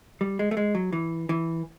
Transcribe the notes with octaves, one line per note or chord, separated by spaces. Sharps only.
G3
G#3
A3
G#3
F#3
E3
E3